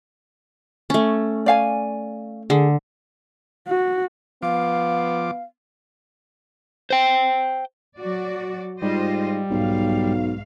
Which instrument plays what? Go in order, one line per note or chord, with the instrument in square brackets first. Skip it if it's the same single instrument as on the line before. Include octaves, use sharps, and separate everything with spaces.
[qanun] A3 C#4
[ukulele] D5 F5 G#5
[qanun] D3 [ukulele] G#4
[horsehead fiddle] F#4
[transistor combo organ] F3 D6 [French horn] B3 [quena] F5
[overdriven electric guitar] C5 G5
[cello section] F#3 F#4 D5
[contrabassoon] G#2 [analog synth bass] G3 [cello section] F4 C5 D#5
[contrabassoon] B1 [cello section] G#2 F5